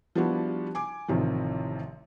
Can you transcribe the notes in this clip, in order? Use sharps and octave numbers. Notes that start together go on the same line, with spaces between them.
F3 G3 B3 D4 E4 F#4
G#5 D6
A1 C3 D#3 F3